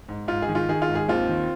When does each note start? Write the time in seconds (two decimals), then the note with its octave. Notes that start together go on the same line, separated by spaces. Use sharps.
0.09 G#2
0.28 G#2 F4
0.42 G#4
0.48 D#3
0.55 F4
0.69 D#3 G#4
0.82 F4
0.89 G#2
0.95 G#4
1.08 D#2 C4 F4
1.29 D#3